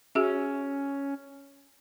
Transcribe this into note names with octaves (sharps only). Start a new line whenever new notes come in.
C#4 F#4 G#4 E5